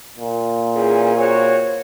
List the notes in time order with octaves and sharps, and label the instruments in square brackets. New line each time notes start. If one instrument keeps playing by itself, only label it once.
[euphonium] A#2
[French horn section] E2 C#4 G#4
C4 F#4 C#5